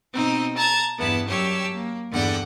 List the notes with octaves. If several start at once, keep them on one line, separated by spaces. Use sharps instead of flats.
B2 C4 D#4
A5 A#5 G#6
E2 G2 B3 E4 A5
F#2 G3 G4 C#5 A5 E6
A#3
E2 G2 D3 F#5 G5